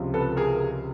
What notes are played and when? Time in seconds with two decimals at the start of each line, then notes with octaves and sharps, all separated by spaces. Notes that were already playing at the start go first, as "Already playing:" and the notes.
Already playing: C#2 C3 F3
0.14 A4 B4
0.37 G#4 A#4